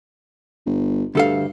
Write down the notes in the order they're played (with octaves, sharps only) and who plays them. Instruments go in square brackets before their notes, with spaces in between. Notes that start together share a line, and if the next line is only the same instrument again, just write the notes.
[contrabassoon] G1
[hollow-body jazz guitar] D2 A4 F5 [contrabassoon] G2